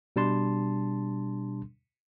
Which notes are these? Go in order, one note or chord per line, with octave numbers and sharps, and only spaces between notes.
B2 G3 D4 A5 C6